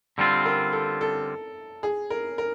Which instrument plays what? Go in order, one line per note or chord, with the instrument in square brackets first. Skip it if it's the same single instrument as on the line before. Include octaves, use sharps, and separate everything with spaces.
[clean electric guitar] D3 G3 C4 F4
[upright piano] A#4
A4
A4
G#4
A#4
A#4